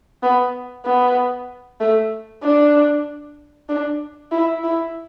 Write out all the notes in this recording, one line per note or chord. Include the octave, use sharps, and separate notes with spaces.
B3
B3
A3
D4
D4
E4
E4